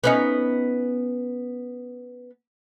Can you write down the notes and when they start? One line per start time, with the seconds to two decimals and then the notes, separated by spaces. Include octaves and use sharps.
0.04 B3 C#4 D#4